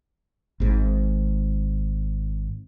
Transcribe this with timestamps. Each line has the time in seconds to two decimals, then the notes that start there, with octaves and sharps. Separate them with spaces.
0.60 G#1 G#2